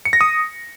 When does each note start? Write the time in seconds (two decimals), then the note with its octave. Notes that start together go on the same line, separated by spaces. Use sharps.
0.05 C#7
0.13 A#6
0.21 D#6